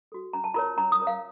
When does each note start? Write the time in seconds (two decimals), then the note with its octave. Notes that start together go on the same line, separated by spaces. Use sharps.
0.12 F#4 A4
0.33 C#4 A#5
0.44 A5
0.54 F4 A#4 C#5 A#5
0.77 C#4 A#5
0.92 D#6
1.00 F4 A#4 C#5
1.07 F5